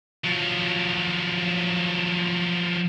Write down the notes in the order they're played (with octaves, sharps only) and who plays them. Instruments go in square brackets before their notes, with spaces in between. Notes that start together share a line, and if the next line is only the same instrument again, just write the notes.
[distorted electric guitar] F3 F#3